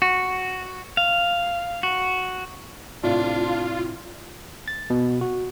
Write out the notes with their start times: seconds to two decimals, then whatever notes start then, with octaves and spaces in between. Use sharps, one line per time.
0.02 F#4
0.97 F5
1.83 F#4
3.04 A2 C3 D4 F4
4.68 A6
4.90 B2
5.21 F#4